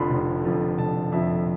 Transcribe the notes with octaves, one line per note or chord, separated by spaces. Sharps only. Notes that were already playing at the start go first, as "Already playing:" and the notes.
Already playing: F1 F2 D3 F3 B5 C6
F1
F2 D3 F3
F1 A5
F2 D3 F3 E5